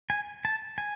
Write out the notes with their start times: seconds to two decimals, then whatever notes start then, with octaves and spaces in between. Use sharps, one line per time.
0.10 G#5
0.45 A5
0.78 G#5